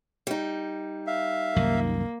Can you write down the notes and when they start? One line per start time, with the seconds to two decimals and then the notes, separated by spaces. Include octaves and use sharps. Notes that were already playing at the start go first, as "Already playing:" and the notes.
0.27 G3 D#4
1.07 E5 F5
1.56 C2 F#2 D#3 A#3